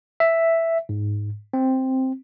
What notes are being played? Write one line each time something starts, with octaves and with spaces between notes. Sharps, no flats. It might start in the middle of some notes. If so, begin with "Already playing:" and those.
E5
G#2
C4